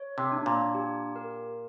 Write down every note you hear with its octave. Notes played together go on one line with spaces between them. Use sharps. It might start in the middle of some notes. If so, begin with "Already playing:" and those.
Already playing: C#5
C3
D4
A#2
G4
A#4